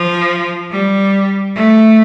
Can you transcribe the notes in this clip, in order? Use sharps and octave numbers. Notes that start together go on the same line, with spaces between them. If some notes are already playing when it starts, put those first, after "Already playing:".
Already playing: F3
G3
A3